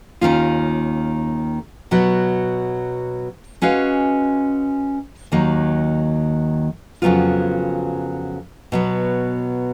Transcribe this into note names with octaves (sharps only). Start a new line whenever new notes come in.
D#2 D#3 A#3 C#4 F4
B2 F#3 B3 F#4
G#3 C#4 F#4 B4 F5
D#2 D#3 F#3 A#3
F2 C#3 F#3 B3 F4
B2 F#3 B3